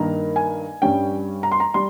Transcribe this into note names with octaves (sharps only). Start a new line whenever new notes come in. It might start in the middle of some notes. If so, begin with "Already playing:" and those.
Already playing: G2 D#3 A#3 A#5
G#5
G2 G3 C#4 G5
A#5
C6
A#5
G3 C6